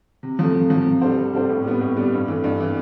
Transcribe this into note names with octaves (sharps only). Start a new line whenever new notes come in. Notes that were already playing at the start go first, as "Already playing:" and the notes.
C3
F3 A3
C3
F3 A3
C3
G3 D4 A4 C5
C3
G3 D4 A4 C5
A2
G3 B3 D4
A2
G3 B3 D4
G2
E3 A3
G2
E3 A3